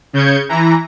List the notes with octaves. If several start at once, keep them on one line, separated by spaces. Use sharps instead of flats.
C#3 G6 G#6 C#7
E3 A#5